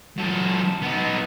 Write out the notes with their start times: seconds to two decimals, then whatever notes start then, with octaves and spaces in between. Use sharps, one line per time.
0.17 F#2 A4
0.82 B3 D#4